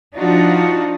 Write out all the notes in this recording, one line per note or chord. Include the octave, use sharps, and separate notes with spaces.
F3 D4 D#4 F4 F#4